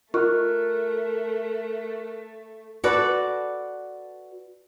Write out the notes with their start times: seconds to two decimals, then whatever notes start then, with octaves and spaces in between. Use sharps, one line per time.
0.14 A3 F4 A#4 F6 F#6
2.84 F#4 A4 B4 D5